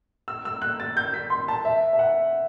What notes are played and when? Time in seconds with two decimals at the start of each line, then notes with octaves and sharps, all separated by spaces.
0.28 E6
0.45 E6
0.62 F#6
0.80 A6
0.97 G6
1.14 B6
1.30 C6
1.48 A5
1.65 E5
1.93 E5
1.99 F#5